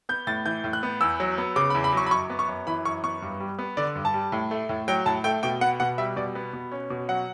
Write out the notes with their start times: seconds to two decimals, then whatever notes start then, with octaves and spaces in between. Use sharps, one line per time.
0.09 B3 G6
0.27 A2 A6
0.46 E3 G6
0.64 A2
0.73 F#6
0.83 B3
1.01 E2 E6
1.20 F#3
1.38 B3
1.56 C#3 D6
1.70 B5
1.75 E2
1.84 B5
1.93 F#3 C#6
2.06 B5
2.11 F#2 C#6
2.30 B3
2.39 C#6
2.48 F#2
2.67 E3 B5
2.85 F#2 C#6
3.03 B3 C#6
3.22 G2
3.40 G3
3.59 B3
3.77 D3 D5
3.95 G2
4.05 A5
4.14 G3
4.32 A2
4.51 A3
4.69 A2
4.88 F#3 G5
5.06 A2 A5
5.24 A3 G5
5.43 B2 G5
5.61 B3 F#5
5.80 B2 F#5
5.98 G3 E5
6.16 B2 D5
6.35 B3
6.53 B2
6.72 C#4
6.90 B2
7.08 F#3 F#5